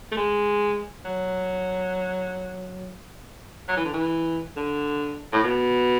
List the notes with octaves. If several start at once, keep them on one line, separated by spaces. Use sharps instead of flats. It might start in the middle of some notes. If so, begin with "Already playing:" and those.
A3
G#3
F#3
F#3
E3
D3
E3
D3
A2
B2